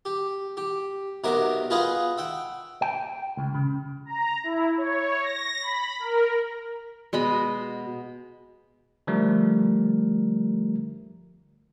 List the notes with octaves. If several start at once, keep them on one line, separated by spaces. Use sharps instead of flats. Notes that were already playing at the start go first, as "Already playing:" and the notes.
G4
G4
B1 C3 F#4 G4 A#4 C5
F4 G#4 B4 D#5 F5 F#5
E5 F#5 G5
G5
C#2
C#3
A#5
E4
C#5
A#6
B5
A#4
B2 G#3 D#5 B5
D3 F3 G3 A3 A#4